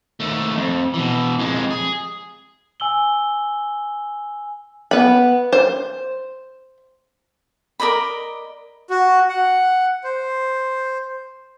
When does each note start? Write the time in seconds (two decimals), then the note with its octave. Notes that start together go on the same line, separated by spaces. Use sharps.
0.20 D#2 A3
0.57 F2
0.94 B2 E3
1.39 F2 G#3
1.71 G#4
2.80 G#5 E6 F#7 G7
4.91 B3 B5
5.53 C5
7.80 A#4 D5 D#5 B5
8.90 F#4
9.29 F#5
10.04 C5